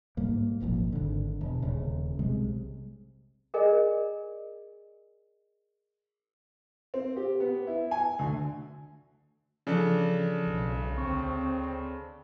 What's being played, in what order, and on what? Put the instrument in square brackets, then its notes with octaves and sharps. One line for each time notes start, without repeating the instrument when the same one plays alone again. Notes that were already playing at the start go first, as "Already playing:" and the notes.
[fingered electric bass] G#2 G3 A#3
D#1 G#1 F2 A#2
G#1 D3
E1
D#1 C#3
B1 C3 G3 G#3
[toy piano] G#4 A#4 D5 D#5 G#5
[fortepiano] C4
G4
B3
E4
G#5
D2
[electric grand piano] C#3 D4 A4 [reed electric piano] E3 F3 C#4
[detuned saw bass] B1
[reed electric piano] D2 C#6 [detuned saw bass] C4